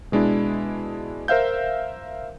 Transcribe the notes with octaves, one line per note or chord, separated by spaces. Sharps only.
B2 G#3 D4 E4
A#4 C5 E5 F5 G6